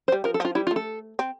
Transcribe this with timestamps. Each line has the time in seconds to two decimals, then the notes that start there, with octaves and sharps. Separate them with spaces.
0.08 C5
0.12 G3
0.24 F3 A#4
0.34 A4
0.40 F3 F4
0.55 G3 E4
0.67 F4
0.71 A3
0.76 A4
1.19 C4